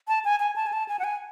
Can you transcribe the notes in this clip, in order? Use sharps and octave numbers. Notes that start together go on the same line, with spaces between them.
A5
G#5
G#5
A5
G#5
A5
G#5
F#5
G#5